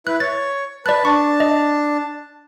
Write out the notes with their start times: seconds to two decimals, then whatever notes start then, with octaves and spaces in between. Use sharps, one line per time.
0.07 E4 B4 F#6
0.20 C#5 A6
0.86 B4 D5 A5 F#6
1.05 D4 A5 C#6
1.40 D#5